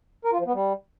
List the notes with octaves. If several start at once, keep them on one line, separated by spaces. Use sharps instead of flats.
A#4
F4
F3
B3
G3